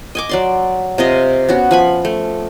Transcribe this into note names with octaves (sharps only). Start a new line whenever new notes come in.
D#5 G#5 D6
F#3 D5 C6
C3 F4 D#5
B3 C#4 F#4
F3 G#5 B5
A3